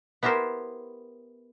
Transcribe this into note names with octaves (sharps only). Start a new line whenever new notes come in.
B3 E4 G4 A#4 C5